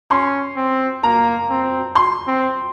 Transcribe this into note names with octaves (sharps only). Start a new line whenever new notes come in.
C#4 C6
C4
A#3 A#5
C4
C6
C4